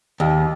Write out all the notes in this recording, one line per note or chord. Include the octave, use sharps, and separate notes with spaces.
D#2